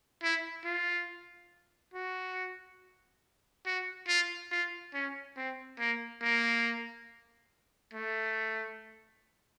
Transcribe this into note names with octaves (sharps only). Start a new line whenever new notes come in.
E4
F4
F#4
F#4
F4
F4
C#4
C4
A#3
A#3
A3